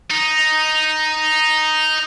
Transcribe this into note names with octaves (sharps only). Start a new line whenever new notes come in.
D#4